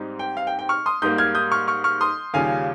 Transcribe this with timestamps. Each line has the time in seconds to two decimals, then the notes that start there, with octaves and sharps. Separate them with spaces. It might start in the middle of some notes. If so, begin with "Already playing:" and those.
Already playing: G#2 G3 C4 D#4
0.19 G5
0.37 F5
0.47 G5
0.59 G5
0.69 C#6 F6
0.86 C6 D#6
1.02 G#2 G3 A#3 D#6 G6
1.18 F6 G#6
1.35 D#6 G6
1.52 C#6 F6
1.68 C#6 F6
1.84 C#6 F6
2.01 C6 D#6
2.33 D#2 C#3 G3 C#4 F4 F5 G#5